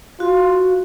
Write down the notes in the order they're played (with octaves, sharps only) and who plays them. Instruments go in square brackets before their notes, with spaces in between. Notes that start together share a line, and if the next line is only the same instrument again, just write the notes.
[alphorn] F4 [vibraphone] F#4